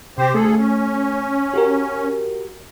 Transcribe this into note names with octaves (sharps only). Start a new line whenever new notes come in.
C3 C4 G4 C5
D2 A3 G#4 A4
C#4
F#4 G4 A#4